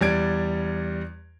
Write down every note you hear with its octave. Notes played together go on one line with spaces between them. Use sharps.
E2 G3 D5 G#6 D7